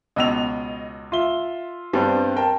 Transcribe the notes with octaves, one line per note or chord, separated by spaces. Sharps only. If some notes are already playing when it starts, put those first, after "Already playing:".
C#2 B2 D#5 E6 F7
F4 E5 G7
G2 G3 B3 C4 D4
A#4 G5 A5